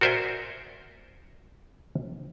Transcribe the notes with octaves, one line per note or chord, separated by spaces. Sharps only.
F#4 A#4 C5 D5 E5 G#5